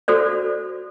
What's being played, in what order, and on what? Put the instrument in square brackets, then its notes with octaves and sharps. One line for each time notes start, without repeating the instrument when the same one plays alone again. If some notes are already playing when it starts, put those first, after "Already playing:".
[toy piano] F#4 A4 C5 D5